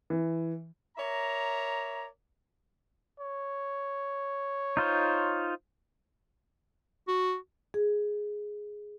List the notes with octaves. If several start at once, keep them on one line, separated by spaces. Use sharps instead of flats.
E3
A#4 C#5 D5 E5 A#5
C#5
D#4 F4 C5
F#4
G#4